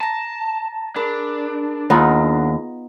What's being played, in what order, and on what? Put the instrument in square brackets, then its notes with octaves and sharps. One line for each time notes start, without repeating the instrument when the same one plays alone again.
[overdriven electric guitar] A5 [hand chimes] A#5 A#6
[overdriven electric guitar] D4 [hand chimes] G#4 A#4 B5
[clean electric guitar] D#2 [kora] B3 D#4 F4 [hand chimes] G#4 F#5 A#6